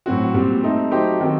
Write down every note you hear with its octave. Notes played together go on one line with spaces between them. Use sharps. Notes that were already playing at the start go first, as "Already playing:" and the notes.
A2 F#3 C4 F#4
A#2 G3 C4
A3 C4 D#4
F#3 A3 D#4 G4 C5
D#3 F#3 C4